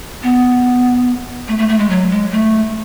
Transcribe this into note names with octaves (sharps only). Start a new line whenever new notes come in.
B3
A3
A3
A3
G#3
F#3
G#3
A3